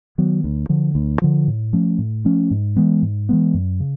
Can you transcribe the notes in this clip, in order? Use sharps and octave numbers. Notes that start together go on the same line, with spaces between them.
D#3 F#3 B3
D2
D3 F3
D2
D3 F3
A2
F3 A3 C#4
A2
F3 A3 C#4
G#2
E3 G#3 B3
G#2
E3 G#3 B3
F#2
C#3